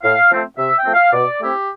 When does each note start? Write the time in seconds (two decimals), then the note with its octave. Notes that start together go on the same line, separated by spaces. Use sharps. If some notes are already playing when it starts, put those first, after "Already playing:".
0.03 A2 F5
0.31 F3 A3 C4
0.58 C3 E5
0.76 G5
0.85 F3 A3 C4
0.94 F5
1.13 B2 D5
1.39 A3 C4 E4 G4